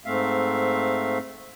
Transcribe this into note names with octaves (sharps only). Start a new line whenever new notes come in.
G#2 A3 C4 E5 F5